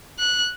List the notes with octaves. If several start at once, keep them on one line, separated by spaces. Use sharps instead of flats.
F#6